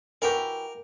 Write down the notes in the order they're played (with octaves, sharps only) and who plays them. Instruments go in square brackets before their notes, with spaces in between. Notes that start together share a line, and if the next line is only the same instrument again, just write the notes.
[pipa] E3 F#4 G4 [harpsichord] A#4